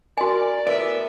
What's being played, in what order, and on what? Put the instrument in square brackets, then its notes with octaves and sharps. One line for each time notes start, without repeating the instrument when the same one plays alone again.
[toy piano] F#4 G#5 [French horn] A#4 [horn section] D5
[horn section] A2 B3 E5 [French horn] A#4 [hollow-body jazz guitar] D5